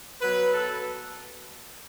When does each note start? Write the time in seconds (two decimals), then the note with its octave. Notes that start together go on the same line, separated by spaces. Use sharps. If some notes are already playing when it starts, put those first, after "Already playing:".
0.22 B2 F#3 B4
0.54 A4